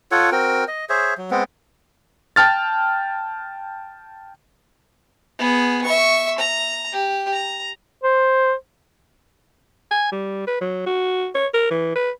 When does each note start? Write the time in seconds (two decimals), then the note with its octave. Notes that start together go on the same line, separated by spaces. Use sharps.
0.12 F4 A4 C#5 F#5
0.32 C4 F#4 A#4 G5
0.68 D#5
0.89 G#4 C5 C#5 E5
1.18 F#3
1.31 G#3 B3 C4
2.36 G5 A5 F6 A6
5.39 B3 G#4
5.84 E5 C#6
6.38 A#5
6.92 G4
7.33 A#5
8.03 C5
9.91 G#5
10.12 G3
10.47 B4
10.61 F#3
10.86 F#4
11.35 C#5
11.54 A#4
11.71 E3
11.95 B4